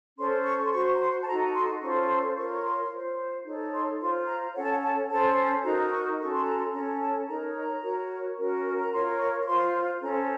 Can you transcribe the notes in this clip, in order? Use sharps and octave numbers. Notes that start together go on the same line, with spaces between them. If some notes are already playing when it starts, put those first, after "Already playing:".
C#4 A4 C5 C6
C#6
C6
F#4 C5 C#6
A#5
C6
A5
D#4 F#4 A4 A#5
C6
C#4 F4 A4 C5 C#6
C6
C#6
C6
F4 A#4 C#5 C#6
C#6
C6
F4 C5
D#4 A4 C#5
C6
F4 C5 C6
A#5
C#4 A4 C#5 F#5
A5
F#5
A5
C#4 A4 C5 A5
D#4 F#4 A#4 A#5
C#6
C#4 F#4 A4 C#6
C6
A#5
C6
C#4 A4 C#5 A#5
A5
D#4 A#4 C#5 A#5
A#5
F#4 A#4 C#5
C#4 F#4 A#4
A#5
F4 A#4 C#5 C6
C#6
C#6
F4 C5 C6
C#4 A4 C5 A#5